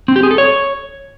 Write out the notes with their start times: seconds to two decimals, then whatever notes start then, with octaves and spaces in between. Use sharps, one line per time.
0.08 C4
0.16 G4
0.23 G#4
0.31 A4
0.38 C#5